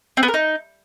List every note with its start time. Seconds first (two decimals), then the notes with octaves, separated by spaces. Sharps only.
0.17 C4
0.23 B3
0.28 A#4
0.34 D#4